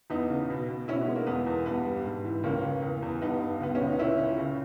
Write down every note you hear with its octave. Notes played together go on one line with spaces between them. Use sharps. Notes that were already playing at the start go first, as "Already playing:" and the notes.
E2 B3 D#4
C#3
B2
B2
B2 C#4 E4
B3 D#4
G#3
A#3
E2 B3
E2
G2 B3
G3
G#2
E3
C#2 A#3 C#4
C#2
E2
E2
G2 B3 D#4
G2
C#2 B3
C#4
C#2
D#4
A#2 C#4 E4
A#2
C#3